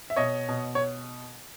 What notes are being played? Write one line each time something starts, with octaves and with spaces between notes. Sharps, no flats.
E5
B2 C#5 D#5
B2
C#5